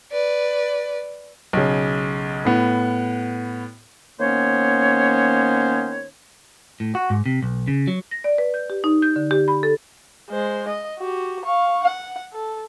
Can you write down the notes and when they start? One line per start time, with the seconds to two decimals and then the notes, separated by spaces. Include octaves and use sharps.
0.12 B4 D5
1.53 B1 C#3
2.45 A2 B3
4.20 D#3 A#3 B3 C#4 C5 C#5
6.80 A2
6.95 F#4
7.10 G#2
7.26 C3
7.43 B1
7.68 C#3
7.88 F#3
8.11 A#6
8.24 D5
8.38 B4
8.54 G6
8.70 G4
8.84 D#4
9.02 G6
9.16 D3
9.31 G4
9.48 B5
9.63 A4
10.30 G#3 C5
10.68 D#5
10.98 F#4 G4
11.44 F5 C#6
11.83 F#5
12.33 A4